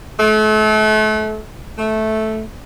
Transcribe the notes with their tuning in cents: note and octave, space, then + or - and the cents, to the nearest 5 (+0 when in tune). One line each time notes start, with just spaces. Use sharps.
A3 -35
A3 -10